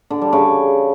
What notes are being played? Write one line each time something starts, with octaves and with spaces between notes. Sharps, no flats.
D3
G3
C#3